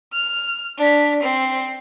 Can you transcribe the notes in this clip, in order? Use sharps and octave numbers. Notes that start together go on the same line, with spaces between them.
F6
D4 B6
C4 C7